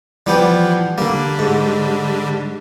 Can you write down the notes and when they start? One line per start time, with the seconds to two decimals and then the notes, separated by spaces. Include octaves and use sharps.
0.26 E3 F3 G3 B3 G4
0.98 D3 G3 A#3
1.39 G#2